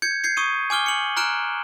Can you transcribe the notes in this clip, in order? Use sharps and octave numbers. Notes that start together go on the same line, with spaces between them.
G6 G#6 C#7
G6 G#6 C7 C#7
C#6 D#6 D#7
G#5 D6 F6 G7
C#7 F#7
A#5 F6 F#6 D7 E7